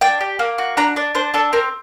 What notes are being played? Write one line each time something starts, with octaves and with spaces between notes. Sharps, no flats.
D4 G5
G4
A#3
F#4
D4 A#5
D4 D5
D4 C5
D4 A4
C4 A#4